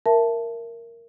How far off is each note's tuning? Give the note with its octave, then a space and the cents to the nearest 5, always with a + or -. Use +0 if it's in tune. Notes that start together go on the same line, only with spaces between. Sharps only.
A#4 -5 E5 +20 A5 +0